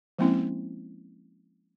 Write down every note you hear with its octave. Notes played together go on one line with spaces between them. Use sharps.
F3 G#3 A#3 C4 C#4 E4